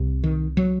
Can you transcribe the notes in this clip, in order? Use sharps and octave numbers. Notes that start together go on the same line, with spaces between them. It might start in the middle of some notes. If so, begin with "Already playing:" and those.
Already playing: C2 C3
D#3
F#3